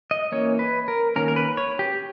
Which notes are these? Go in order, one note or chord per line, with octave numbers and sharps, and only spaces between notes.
D#5
E3 A#3 C#4 C#5
B4
A#4
D#3 A#3 C#4 A#4
A#4
B4
C#5
G4